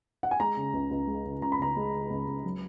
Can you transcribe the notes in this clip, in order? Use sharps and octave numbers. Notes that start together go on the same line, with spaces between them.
F#5
G#5
G#3 A#5
C#3
C#2
C#2
G#3
C#3
C#2 A#5
B5
C#2 A#5
G#3
C#3
C#2
C#2
F#3